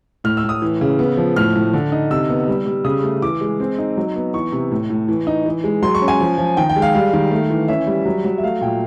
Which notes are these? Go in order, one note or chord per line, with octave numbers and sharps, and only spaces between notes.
A2 F6
E6
A2
D#6
E3
C#3
B3
F3
A2 F6
A2
D3
D#4
C3 E6
B3
G3
G3
C#3 D#6
A3
E3 D6
G#3
C4
D#4
F#3
B3
E3 C#6
C3
A2
A2
E3
D#4
E3
G#3
F#3 C6
C#6
C#4
G#5
F3
F3
D#3 G5
G5
G#3
F5
G3 F5
D#3
A3
E3
C#4 E5
G3
F#3
F#3
E5
A3 F5
A#2 G5